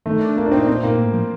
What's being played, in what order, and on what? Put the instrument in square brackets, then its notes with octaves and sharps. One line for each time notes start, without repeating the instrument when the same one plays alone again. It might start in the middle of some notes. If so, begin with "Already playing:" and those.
[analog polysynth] D#3 [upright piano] A3
[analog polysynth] D4
[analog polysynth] A#2 [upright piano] A#3
[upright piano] D4
[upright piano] C4 [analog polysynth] D#4
[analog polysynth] A#2 [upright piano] C4
[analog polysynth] A#2 [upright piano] A#3
[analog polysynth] A2
F3